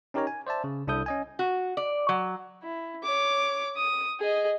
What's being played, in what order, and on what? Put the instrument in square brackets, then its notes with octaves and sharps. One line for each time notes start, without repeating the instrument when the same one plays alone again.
[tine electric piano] C#4 D#4 G4 A#4 C#5 A#5
G#5
C5 D5 E5 A5
C#3
C2 D4 E4 A4 D#6 G6
C#4 D#5 G#5
[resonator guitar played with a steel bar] F#4
D5
F#3
[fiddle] E4
C#5 D6
D#6
G#4 D#5